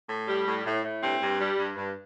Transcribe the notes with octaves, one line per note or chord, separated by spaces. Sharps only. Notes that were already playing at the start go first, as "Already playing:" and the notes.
A2
G3
A2
A2
A2
G2 C4
G2
G3
G2
G2